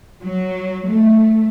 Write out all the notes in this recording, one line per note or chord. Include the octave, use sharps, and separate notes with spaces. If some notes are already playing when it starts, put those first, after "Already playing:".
F#3
A3